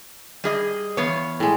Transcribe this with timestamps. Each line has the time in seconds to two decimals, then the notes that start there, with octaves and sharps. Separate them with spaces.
0.44 G3 G#4 D#5
0.97 E2 B3 C#5 F5
1.40 A2 G#3